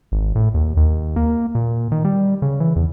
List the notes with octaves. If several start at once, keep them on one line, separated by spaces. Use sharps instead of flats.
G#1
A2
D#2
D#2
A#3
A#2
D#3
G3
C#3
E3
E2